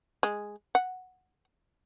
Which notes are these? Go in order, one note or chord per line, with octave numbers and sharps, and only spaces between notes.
G#3
F#5